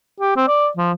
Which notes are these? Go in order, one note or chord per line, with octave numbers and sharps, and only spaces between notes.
G4
C4
D5
F3